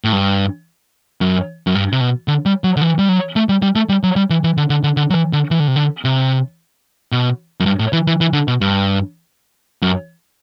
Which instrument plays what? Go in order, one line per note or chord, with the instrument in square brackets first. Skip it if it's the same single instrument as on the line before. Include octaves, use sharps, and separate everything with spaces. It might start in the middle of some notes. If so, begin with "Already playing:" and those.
[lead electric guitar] A2
G2
F#2
F#2
G2
C3
B2
D3
G3
F#3
D3
E3
G3
F#3
A3
G3
G3
A3
G3
F#3
G3
E3
E3
D3
D3
D3
D3
F#3
E3
D3
E3
D3
C3
D3
C3
B2
F#2
G2
A2
E3
E3
E3
D3
B2
G2
F#2